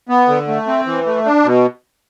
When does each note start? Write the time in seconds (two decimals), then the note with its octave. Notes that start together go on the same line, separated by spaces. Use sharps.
0.09 B3
0.28 D3
0.48 A3
0.67 C4
0.86 E3
1.06 A3
1.25 D4
1.45 B2